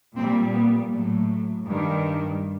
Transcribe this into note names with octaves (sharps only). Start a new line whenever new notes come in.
A#2 G3 C4
B3
A2 F#3 A3
G2 D#3 G3